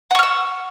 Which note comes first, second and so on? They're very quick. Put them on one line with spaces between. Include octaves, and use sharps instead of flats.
F#5 C#6 F6 E6